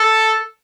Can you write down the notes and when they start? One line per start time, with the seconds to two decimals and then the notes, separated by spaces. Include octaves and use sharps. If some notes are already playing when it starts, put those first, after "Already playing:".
Already playing: A4